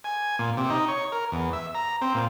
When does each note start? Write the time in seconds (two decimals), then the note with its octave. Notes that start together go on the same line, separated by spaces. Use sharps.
0.04 G#5
0.39 A#2
0.57 C3
0.70 D#4
0.88 C#5
1.12 A#4
1.32 E2
1.53 E5
1.75 A#5
2.01 C4
2.14 A#2